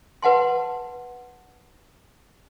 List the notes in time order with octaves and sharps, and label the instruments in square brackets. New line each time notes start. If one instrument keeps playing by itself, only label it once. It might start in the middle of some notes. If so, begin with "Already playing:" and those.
[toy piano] B4 F#5 A5 C6